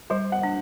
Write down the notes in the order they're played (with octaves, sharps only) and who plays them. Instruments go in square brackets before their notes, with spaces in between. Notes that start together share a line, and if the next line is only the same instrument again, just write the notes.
[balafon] G3 [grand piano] C5
[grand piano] F#5
[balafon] D4